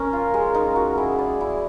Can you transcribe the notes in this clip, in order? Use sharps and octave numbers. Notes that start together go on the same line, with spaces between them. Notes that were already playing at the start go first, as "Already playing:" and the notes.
Already playing: C#4 A#4
F4
G#3
D#4
F#4
E4 G#4
D5
E4